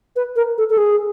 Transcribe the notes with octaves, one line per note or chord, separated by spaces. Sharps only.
B4
A#4
A4
A4
G#4